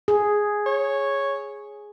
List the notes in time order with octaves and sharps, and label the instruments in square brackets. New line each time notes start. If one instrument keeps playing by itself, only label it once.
[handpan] G#4
[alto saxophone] C#5